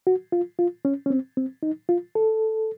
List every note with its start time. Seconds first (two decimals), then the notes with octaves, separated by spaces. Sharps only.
0.07 F#4
0.32 F4
0.59 F4
0.85 C#4
1.06 C#4
1.10 C4
1.37 C4
1.63 D#4
1.89 F4
2.15 A4